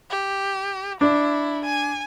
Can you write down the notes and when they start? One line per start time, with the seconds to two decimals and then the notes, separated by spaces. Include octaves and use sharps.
0.10 G4
1.01 D4 E4
1.65 G#5